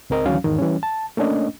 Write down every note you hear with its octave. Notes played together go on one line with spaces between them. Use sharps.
C#2 C4 A#4 D#5
D2 D#3 E3 F#3 C#4 F5
E2 G#2 D#3
E3 G3 C#4
A5
A3 A#3 C#4 D4 D#5